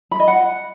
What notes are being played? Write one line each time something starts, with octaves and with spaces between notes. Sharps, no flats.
B5
D#5
F#5